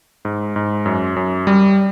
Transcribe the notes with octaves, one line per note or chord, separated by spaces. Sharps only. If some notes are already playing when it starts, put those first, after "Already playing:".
G#2
G#2
F#2
F#2
G3